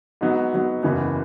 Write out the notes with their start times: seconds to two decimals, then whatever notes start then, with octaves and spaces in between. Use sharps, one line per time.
0.21 G#2 F#3 B3
0.53 G#2 F#3 B3
0.83 F#1 E2 C#3 E3 B3